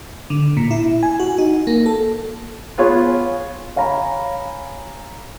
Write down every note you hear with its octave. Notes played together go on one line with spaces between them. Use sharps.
D3
A#2
E4
G#5
F#4
D#4
A#3
A4
B3 F4 G#4 C#5
C#5 F5 G#5 A#5 B5